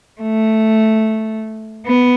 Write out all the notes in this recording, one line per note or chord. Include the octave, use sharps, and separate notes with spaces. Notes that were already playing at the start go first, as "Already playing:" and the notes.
A3
B3